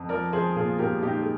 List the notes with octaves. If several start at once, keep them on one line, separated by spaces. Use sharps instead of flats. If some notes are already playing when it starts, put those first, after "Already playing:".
Already playing: F2
F3 A#4 D5
F3 G#4 C5
A#2 F4 G#4
A#2 G4 A#4
A#2 D#4 G4
G#4